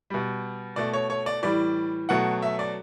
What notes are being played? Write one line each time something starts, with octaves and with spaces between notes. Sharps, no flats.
B2 G3
B2 A3 D5
C#5
C#5
D5
A2 E3 G3 D5
B2 F#3 A3 F#5
E5
D5